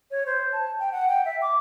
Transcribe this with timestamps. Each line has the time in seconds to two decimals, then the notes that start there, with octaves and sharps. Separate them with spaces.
0.11 C#5
0.26 C5
0.53 A5
0.80 G5
0.92 F#5
1.09 G5
1.25 E5
1.42 D6